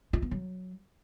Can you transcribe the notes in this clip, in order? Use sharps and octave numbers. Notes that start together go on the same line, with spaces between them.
F4
B3
F#3